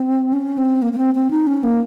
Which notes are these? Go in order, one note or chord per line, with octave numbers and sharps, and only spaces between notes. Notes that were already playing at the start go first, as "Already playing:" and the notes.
Already playing: C4
C#4
C4
A#3
A#3
C4
C4
D#4
C#4
A#3